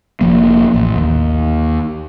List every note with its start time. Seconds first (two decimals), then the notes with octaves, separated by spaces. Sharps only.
0.21 F1 F3 A#3
0.74 A1
0.96 D#2